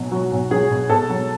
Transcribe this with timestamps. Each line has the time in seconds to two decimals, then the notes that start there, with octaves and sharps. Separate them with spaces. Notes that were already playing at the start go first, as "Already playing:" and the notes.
Already playing: B1 B2 F#3
0.12 F#3 F#4
0.32 B1
0.50 F#3 G#4
0.70 B2
0.90 B2 A4
1.10 F#3